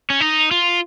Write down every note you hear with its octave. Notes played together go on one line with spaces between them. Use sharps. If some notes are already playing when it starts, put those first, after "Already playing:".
C#4
D#4
F4